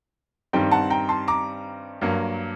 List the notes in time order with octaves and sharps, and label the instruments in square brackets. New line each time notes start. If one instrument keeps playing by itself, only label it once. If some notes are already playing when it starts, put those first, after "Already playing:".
[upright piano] G2 D#3 G3 C4 G5
F#5 A5
G5 A#5
A5 C6
A#5 D6
G2 F#3 A#3